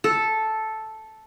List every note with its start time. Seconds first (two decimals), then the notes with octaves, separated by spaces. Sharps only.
0.04 A4